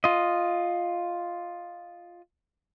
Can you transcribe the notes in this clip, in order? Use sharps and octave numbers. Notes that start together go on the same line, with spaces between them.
F4 D#5